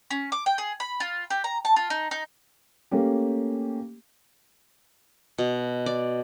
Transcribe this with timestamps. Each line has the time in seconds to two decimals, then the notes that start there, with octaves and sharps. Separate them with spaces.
0.10 C#4
0.32 D6
0.46 G5
0.58 G#4
0.80 B5
1.00 F4
1.30 G4
1.44 A#5
1.65 A5
1.76 F4
1.90 D#4
2.11 D#4
2.91 A3 A#3 C#4 G4
5.38 B2
5.86 D5